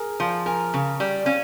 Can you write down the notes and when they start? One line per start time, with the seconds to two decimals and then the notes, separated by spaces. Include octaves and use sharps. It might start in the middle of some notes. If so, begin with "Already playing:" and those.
Already playing: G#4 A#4
0.20 F3 F5
0.46 A#4 G#5
0.74 C#3
1.00 G3
1.26 C#4 F5